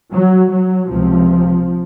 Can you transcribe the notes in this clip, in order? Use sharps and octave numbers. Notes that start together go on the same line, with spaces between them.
F#3
F#3
C#2 C3 F3